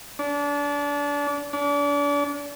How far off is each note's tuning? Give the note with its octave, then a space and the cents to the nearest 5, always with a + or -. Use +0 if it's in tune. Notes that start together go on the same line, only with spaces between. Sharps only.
D4 -30
D4 -35